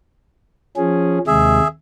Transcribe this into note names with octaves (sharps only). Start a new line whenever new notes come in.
F3 C#4 G#4
D#2 C3 G#3 G#4 E5